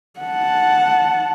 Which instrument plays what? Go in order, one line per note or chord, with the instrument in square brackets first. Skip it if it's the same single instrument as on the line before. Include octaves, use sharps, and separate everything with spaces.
[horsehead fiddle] F#5 A5